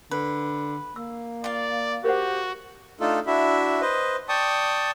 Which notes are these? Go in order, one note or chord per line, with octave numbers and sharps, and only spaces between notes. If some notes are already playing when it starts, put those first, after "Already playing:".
D3 B4
A#3 E6
F4 D5 F5
F#4 G4 A#4 C5 F#5
A3 D4 D#4 F4 A4
D4 E4 F#4 E5
B4 C5 D#5
D5 G5 A5 C#6 D#6